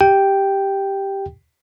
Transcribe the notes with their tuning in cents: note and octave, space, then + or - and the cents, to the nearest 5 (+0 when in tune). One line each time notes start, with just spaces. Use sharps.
G4 +0 G5 +0